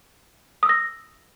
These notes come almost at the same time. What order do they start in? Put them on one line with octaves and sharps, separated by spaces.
D#6 E6 A#6